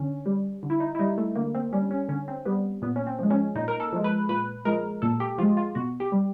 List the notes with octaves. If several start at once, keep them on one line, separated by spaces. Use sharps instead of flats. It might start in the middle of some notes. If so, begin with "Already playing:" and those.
Already playing: D3 C#4
G3
D3
E4
D#4
E4
G3 D#4
A3
D3 A#3
C4
G3 C#4
C#4
D3 C#4
C4
G3 B3
A#2 B3
C#4
C4
F3 G#3
C#4
A#2 D#4
A#4
A4
F3 G#3
B4
A#2 B4
F3 G#3 A#4
A#2 A4
G4
F3 G#3 F4
F4
B2 F#4
G4
G3